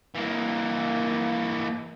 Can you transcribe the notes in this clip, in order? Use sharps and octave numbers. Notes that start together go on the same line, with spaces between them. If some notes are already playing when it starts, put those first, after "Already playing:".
E3 A#3